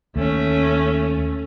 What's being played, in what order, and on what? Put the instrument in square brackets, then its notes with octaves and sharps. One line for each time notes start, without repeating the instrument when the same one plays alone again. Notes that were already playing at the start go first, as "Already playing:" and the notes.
[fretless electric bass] D#2 [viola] A3 C#4